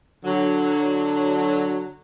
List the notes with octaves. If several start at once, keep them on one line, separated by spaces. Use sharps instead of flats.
D3 F#3